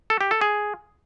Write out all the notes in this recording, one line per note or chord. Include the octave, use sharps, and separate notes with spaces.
A4
G4
A4
G#4